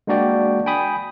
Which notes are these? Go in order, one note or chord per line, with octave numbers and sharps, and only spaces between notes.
G#3 A#3 D4 F#4 D5 G5
G5 G#5 B5 D#6